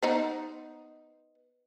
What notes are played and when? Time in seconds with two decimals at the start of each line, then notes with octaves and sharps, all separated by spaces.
0.03 B3 D#4 C5